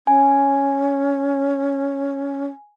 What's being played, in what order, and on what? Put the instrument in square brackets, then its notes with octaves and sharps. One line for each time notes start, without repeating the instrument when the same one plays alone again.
[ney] C#4 [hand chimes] G#5